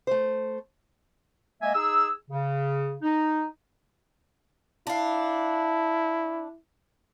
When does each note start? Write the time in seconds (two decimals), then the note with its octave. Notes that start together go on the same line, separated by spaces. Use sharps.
0.07 A3 C5
1.62 G#3 A#3 D#5 E5 G#5
1.75 D#4 G#4 E6
2.30 C#3
3.02 D#4
4.87 D4 E4 F5